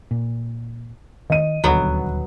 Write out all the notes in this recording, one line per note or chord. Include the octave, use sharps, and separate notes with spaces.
A#2
D#3 D#5 D#7
D#1 D2 F#3 B3